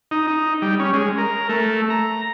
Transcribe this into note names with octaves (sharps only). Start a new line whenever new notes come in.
D#4
D#4
G3
C#4
G#3
A#4
A3
A#5